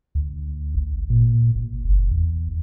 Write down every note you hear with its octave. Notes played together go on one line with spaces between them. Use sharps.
D2
G#1
A#2
G#1
F#1
E2